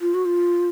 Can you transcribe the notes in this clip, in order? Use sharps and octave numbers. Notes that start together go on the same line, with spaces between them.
F4
F#4
F4